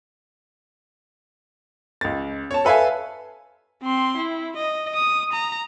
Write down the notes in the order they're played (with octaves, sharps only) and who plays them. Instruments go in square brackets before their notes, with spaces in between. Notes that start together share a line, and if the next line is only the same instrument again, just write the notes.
[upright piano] C#2 A6
C#5 A5
A4 B4 E5 F5 G#5
[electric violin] C4 C6
E4
D#5
D#6
A#5